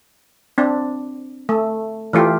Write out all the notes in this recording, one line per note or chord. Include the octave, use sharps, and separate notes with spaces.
C4 D4
A3
E3 A3 F4 G4